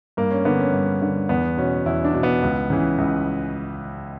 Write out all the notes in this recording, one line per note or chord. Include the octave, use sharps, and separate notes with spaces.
G2 A#3
C#4
D3 B3
C#4
G2
D3
E2 B3
B2 C#4
E2 E4
D4
B2
B3
C#2
C#3 E3
C#2